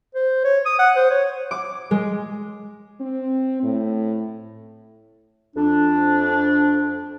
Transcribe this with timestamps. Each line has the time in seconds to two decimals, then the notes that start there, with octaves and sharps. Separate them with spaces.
0.15 C5
0.44 C#5
0.66 D#6
0.79 F#5
0.96 C5
1.10 C#5
1.51 D6
1.91 G#3
3.01 C4
3.63 A2
5.55 F2 D4